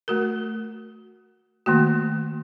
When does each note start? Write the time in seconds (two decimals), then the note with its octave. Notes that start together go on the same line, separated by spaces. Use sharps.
0.08 A3 F#4 A#4
1.66 D#3 A3 A#3 F#4